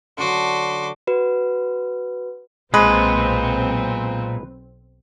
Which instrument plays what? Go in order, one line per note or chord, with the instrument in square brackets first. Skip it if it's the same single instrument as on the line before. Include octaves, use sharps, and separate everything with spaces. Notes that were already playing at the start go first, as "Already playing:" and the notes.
[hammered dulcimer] D3 F#3 [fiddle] F#4 D6 [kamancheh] C6
[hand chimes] F#4 B4
[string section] B1 C4 [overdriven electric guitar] A#2 [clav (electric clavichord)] G#3 [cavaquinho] B4